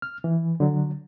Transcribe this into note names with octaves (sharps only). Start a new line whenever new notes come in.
F6
E3
D3 F#3